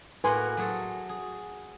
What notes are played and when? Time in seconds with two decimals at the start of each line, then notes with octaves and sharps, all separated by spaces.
0.24 A2 A#3 F#4 B4 G#5 C6
0.57 F#3 G#4 A4
1.09 G#4